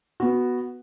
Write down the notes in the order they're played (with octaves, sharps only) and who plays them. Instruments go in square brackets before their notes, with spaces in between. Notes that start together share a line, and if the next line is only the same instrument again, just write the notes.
[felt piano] B3 F#4